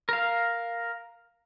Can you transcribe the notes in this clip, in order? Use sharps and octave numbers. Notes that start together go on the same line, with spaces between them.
A#4 F5